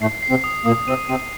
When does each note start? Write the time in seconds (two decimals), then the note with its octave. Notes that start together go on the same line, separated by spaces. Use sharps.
0.01 A2 A3 C7
0.23 C7
0.30 C3 C4
0.44 D#6
0.65 A#2 A#3 D#6
0.87 C3 C4 D#7
1.08 C3 C4 D#7